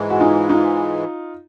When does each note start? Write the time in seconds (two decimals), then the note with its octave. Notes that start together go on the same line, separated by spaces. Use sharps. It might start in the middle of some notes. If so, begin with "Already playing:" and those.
Already playing: G#2 E3 G#3
0.10 F#4
0.20 D#4 F4
0.49 D#4 F4